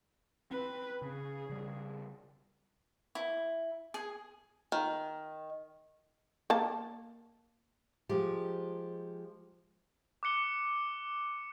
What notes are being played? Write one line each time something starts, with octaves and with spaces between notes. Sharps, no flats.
C4 B4
C#3 G#4
C#3 G3
E4
G#4
D#3
A#3 A5
F3 G#3 G4
D6 F#6 C#7 G7